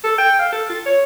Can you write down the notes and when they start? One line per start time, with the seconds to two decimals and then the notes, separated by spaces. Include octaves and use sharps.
0.04 A4
0.18 G5
0.39 F5
0.53 A4
0.70 F4
0.86 C#5